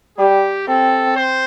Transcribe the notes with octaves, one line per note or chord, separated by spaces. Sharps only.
G3 G4
C4 A4
C5